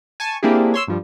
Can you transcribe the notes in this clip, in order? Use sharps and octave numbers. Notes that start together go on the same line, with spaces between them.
G#5 A5 C#6
A#3 C4 D4 E4 G4 G#4
C#5 C6 E6
G2 F3 G3